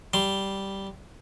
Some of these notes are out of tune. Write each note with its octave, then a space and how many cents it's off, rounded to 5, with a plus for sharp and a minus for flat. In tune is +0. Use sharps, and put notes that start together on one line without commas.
G3 -5 C6 +0